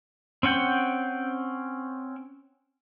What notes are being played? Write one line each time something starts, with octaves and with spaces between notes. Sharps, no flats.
C4 C#4 F#5 G5